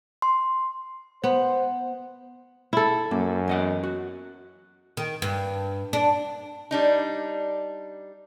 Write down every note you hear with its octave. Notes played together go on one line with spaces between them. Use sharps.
C6
B3 C5
E4 A4
F#2 A#3
E2 D#5 F#5
F#4
D#3
G2
D4
G3 D4 D#4